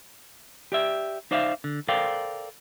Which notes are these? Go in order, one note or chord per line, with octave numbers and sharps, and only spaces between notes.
G4 D5 E5
D#4 C5 D5 E5 F5
D3
A4 A#4 C5 D5 F5 G5